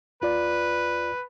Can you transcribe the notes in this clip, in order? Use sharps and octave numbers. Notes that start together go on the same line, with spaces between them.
D#2 F4 B4 D5